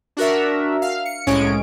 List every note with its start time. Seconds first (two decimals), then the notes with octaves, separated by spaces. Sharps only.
0.17 D4 F#4 A#4 E5
0.82 F5
1.05 C#7
1.27 C2 A2 G#3 C#4 C#5 D7